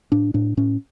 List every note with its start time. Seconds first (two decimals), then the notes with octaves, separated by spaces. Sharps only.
0.12 A2 D4
0.34 A2 D4
0.57 A2 C#4